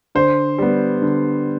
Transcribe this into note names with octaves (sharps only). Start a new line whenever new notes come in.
D3 C5
G3 B3
D3